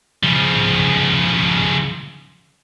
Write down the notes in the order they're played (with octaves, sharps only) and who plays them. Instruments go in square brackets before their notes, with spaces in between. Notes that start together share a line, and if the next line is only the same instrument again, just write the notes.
[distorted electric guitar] C#3 F3